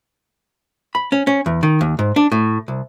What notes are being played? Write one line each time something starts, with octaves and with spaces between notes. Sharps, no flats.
B5
C#4
C#4
E2
D#3
D#2
G#2
D4
A2
C2